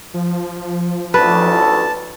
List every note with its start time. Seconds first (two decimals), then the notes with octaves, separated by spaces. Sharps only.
0.14 F3
1.14 A1 D2 B4 A5